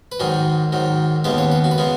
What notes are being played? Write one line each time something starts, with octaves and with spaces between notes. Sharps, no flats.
B4
G#2 D#3 F#3 G#4
G#2 D#3 F#3
D#2 C#3 G#3 B3 B4
C#5
B4
F#4
B4
C#3 G#3 B3 G#4